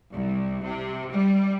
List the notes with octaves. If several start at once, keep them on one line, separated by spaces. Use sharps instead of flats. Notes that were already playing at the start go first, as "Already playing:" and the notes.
C2
C3
G3